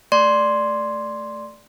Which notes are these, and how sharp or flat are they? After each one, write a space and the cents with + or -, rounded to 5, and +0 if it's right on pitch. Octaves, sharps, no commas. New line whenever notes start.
A3 +0 D5 +0 C6 +0